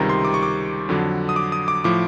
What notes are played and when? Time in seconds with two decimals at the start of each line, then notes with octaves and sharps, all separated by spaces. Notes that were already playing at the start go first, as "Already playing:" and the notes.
Already playing: C#2 C3 D#3 G3 A#5
0.09 C6
0.25 D6
0.34 C#6
0.43 D6
0.89 F2 D3 F#3
1.29 D#6
1.36 D6
1.52 D#6
1.68 D6
1.84 A2 F3 D6